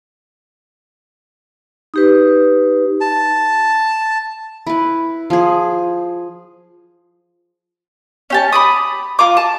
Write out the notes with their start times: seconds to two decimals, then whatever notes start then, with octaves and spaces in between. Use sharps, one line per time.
1.94 D#4 G4 B4
3.01 A5
4.67 E4 B4
5.30 F3 G#4
8.30 C#4 G4 A5
8.53 B5 D6 D#6
9.19 F4 A#5 D6
9.37 A5